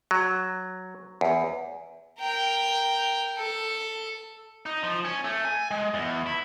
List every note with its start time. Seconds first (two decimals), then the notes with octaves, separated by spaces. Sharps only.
0.11 F#3
1.21 E2
2.20 A#4 G5
3.37 A4
4.66 D#4
4.83 F3
5.05 C#4
5.24 A3
5.45 G#5
5.71 G#3
5.94 E2
6.26 E4